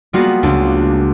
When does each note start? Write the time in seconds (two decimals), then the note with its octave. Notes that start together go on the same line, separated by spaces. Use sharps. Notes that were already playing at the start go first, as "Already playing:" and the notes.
0.13 G3 A#3 B3 F4 F#4 G#4
0.43 C#2 D4